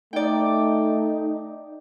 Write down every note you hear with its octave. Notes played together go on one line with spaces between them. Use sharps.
A3 D#4 D5 G5